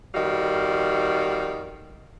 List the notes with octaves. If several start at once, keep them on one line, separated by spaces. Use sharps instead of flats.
F2 D#3 G3 F#4 F5